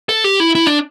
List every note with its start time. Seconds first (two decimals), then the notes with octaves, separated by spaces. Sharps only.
0.09 A4
0.24 G4
0.40 E4
0.55 E4
0.66 D4